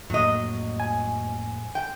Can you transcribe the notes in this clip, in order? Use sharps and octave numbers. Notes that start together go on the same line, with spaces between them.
F2 A2 F#3 A#3 D#5
G#5
G5